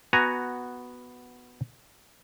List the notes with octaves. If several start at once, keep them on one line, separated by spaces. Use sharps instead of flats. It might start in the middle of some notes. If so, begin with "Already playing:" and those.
B3 F#4 G#5 A#5